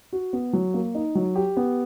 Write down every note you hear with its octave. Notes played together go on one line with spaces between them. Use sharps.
F#4
B3
F#3
A#3
D#4
F#3
G4
B3